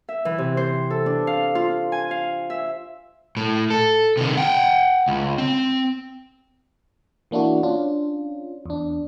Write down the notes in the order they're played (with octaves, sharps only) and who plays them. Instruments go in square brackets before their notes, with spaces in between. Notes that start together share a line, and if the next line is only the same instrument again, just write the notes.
[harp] E5
E3
C3
C5
A4
D4
F5
F4
G#5
F5
E5
[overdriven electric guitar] A2
A4
C3 D#3
F#5 G5
C#2
C4
[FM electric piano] E3 A#3 D4 E4 F#4
C#4 D4 F4
E2 D4